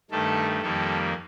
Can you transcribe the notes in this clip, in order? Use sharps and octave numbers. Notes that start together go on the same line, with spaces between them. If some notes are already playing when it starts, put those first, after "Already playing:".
G2 D#3 A3 A4
F2 D#3 G3 A#3 A4